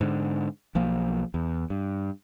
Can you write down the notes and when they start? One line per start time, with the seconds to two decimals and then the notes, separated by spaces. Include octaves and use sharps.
0.01 G#2 D3
0.75 B1 F3 A#3
1.34 E2
1.70 G2